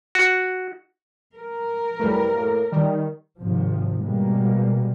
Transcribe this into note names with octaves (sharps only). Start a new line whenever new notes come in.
F#4
A#4
F#2 C3 G3 A3 E4 B4
A2 A#3
D#3 G3 D#4
G#1 C3 F3
B2 G3 G#3 A#3